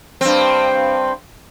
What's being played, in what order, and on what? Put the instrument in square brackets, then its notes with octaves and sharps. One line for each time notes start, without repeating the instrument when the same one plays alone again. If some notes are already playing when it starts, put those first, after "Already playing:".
[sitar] G2 C4